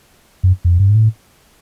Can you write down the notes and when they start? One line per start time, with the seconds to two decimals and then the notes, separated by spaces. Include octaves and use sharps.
0.43 F#2
0.65 F2
0.79 G2
0.89 G#2
0.95 A2